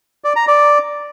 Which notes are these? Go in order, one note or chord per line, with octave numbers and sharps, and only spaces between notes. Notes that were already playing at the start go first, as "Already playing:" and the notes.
D5
A#5
D5